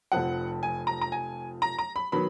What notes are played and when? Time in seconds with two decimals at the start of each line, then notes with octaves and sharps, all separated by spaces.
0.12 F1 F2 F3 F#5
0.63 G#5
0.87 A#5
1.01 A#5
1.12 G#5
1.62 A#5
1.79 A#5
1.96 B5
2.12 D#3 F#3 B3 B5